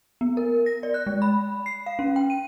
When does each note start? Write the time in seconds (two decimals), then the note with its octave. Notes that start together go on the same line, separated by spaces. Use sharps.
0.21 B3
0.37 A#4
0.66 A#6
0.83 D5
0.94 F#6
1.07 G#3
1.22 B5
1.66 C7
1.86 F5
1.99 C#4
2.16 G5
2.30 D#7